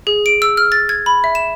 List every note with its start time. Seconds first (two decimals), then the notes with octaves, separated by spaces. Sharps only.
0.07 G#4
0.26 D7
0.42 E6
0.57 F6
0.72 A6
0.89 G#6
1.06 B5
1.24 E5
1.35 E7